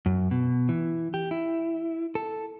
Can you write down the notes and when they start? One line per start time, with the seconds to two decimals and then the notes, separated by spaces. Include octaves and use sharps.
0.06 F#2
0.31 B2
0.69 E3
1.14 G4
1.31 E4
2.15 A4